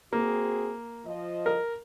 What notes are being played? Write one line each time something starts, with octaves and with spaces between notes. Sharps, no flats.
A#3 C4 F#4 G#4
F3 D#5
A#4